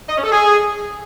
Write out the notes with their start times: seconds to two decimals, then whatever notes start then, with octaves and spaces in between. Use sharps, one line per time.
0.09 D#5
0.17 C#4
0.24 A4
0.31 G#4